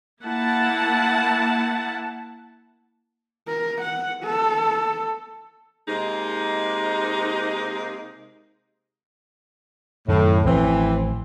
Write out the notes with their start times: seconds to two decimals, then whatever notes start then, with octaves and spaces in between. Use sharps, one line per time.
0.22 A#3 E4 F#5 A5
3.47 A#4
3.81 F#5
4.23 A4
5.87 C3 G#3 A#3 D#4
10.08 F#2 A2 D#3
10.45 A1 E3 F3 C4